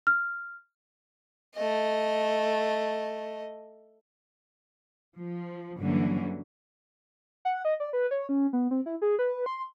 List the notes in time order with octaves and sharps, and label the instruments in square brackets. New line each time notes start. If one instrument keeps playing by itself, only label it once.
[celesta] F6
[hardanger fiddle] A3 D#5
[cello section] F3
G2 D3 E3 F#3 A#3 C#4
[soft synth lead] F#5
D#5
D5
B4
C#5
C#4
B3
C4
E4
G#4
B4
C6